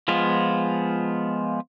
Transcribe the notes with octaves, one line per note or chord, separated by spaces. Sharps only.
F3 G#3 B3 F4